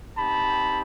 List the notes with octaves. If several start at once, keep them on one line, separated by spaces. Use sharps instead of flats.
C4 D#4 G4 A5 B5